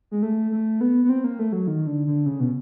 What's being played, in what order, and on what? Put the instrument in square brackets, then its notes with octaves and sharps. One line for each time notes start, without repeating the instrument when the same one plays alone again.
[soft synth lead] G#3
A3
A3
B3
B3
C4
A#3
A3
F#3
D#3
D3
D3
C#3
B2